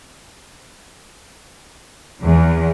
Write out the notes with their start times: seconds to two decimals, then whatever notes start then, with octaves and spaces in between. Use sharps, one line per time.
2.23 E2